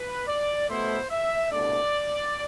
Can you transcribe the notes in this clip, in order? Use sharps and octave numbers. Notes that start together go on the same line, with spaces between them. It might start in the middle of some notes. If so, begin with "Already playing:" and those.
Already playing: B4
D5
B2 A3 E4 C5
E5
C2 B2 A3 D4 D5